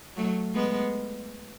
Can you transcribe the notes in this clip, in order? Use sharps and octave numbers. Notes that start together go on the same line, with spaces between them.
F#3 A3
G#3 B3